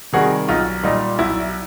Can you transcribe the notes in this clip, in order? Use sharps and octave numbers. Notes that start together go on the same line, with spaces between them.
C3 D#3 G3 F#4 G#4
B1 D#4 F4
A#2 G3 D#4
B1 E4